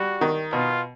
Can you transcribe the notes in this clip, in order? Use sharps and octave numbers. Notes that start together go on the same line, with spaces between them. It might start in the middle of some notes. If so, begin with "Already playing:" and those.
Already playing: G3 F#4
D#3
B2 F4